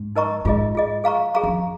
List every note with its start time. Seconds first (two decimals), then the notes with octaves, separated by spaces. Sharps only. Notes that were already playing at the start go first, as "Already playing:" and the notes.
Already playing: G#2
0.16 D#4 A#4 D#5 A#5 C#6
0.45 G#2 F4 G#4 D#5
0.75 F4 G#4 D#5
1.04 G#4 F5 A#5 C#6
1.34 G#4 F5 A#5 C#6
1.44 F2